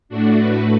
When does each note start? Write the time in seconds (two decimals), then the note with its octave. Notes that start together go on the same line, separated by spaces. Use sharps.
0.09 A2 A3 D4 F#4
0.37 F#4 B4